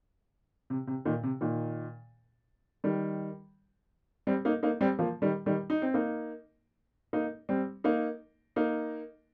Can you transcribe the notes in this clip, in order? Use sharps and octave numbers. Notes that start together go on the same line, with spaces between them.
C3
C3
A#2 D#3
C3
A#2 D#3
D#3 G3
G3 C4
A#3 D#4
A#3 D#4
G3 C4
F3 A#3
D#3 G3
D#3 G3
D#4
C4
A#3 D#4
A#3 D#4
G3 C4
A#3 D#4
A#3 D#4